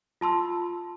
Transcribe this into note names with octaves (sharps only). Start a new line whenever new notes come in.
F4 A5 C6 E6